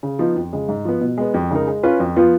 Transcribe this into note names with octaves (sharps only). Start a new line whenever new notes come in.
C#3
F3 B3 D#4
F2
C#3 G#3
G#2
F3 B3
B2
G#3 B3
F2
C#3 G#3 D#4 A#4
G#3
C#4 F4 B4
F2
F3 B3 F4